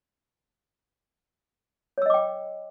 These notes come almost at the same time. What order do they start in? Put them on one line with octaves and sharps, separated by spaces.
C#5 E6 D#5 D6 G5